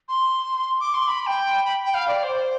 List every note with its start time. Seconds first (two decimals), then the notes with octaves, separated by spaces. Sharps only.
0.09 C6
0.80 D6
0.94 C6
1.08 B5
1.22 B5
1.27 G5
1.65 B5
1.85 G5
1.94 F5
2.08 D5
2.23 C5